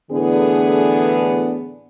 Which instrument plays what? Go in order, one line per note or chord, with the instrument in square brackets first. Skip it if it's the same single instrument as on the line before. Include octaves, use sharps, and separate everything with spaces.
[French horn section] A2 D3 E3 B3 D4 G#4